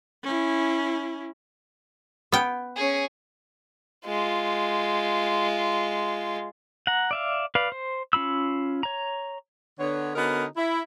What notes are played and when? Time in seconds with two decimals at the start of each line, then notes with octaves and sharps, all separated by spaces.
0.23 C#4 E4
2.32 B3 G5
2.76 C#4 G#4
4.06 G#3 F4
6.87 F#5 A#5
7.11 D5 E5 F5
7.55 B4 D5 F5
7.72 C5
8.13 C#4 F4 B5 E6
8.83 C#5 A#5
9.78 D3 B3 C#5
10.15 D3 B3 C#4 D#4 F#4 A#4
10.57 E4